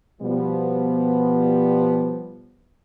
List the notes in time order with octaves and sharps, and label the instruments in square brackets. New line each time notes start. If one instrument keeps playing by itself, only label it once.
[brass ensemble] B2 F3 G3 B3